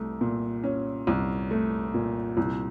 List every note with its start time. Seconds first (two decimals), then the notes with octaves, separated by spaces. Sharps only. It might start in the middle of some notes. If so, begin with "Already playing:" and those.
Already playing: C2 A3
0.21 A#2
0.64 C#4
1.07 C2
1.51 A3
1.94 A#2
2.37 C2